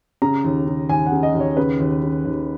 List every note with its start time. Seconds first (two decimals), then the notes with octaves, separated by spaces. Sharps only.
0.22 C#3 A#5
0.44 D#2
0.67 C#3
0.89 D#2 G#5
1.06 F#5
1.12 C#3
1.23 D#5
1.34 D#2
1.40 C#5
1.57 C#3 B4
1.80 D#2
2.03 C#3
2.25 D#2